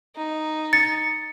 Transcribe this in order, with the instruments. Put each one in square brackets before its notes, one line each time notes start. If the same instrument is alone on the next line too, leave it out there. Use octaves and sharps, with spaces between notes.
[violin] D#4
[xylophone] A6 [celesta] C#7